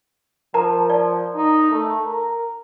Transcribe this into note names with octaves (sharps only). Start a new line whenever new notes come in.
F3 A#4 A5 A#5
D5
D#4
A3
A#4